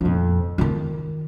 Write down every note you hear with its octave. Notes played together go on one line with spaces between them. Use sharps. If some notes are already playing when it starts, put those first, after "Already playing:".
F2 A#2
D#3 F4